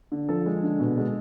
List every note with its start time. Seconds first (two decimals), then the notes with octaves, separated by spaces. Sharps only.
0.12 D3
0.29 F3 A4
0.46 G#3
0.63 D3
0.80 B2
0.98 G#3